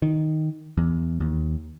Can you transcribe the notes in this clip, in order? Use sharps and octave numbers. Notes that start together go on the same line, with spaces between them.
D#3
E2
D#2